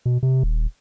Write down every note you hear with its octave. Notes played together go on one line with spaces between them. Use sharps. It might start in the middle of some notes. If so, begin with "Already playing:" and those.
B2
C3
D#1